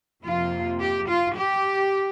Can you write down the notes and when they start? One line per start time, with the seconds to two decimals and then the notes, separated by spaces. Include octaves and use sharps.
0.23 F2 C3 F3 A#3 F4
0.80 G4
1.08 F4
1.35 G4